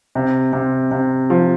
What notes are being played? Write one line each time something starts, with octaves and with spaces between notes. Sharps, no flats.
C3
C3
C3
F3